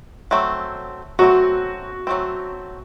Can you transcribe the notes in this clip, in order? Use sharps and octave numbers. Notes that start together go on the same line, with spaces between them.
F#3 A3 C4
F#3 A3 C4 F#4
F#3 A3 C4